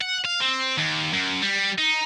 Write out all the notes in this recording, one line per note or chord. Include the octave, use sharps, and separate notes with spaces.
F#5
F5
C4
D#2
F#2
G3
D#4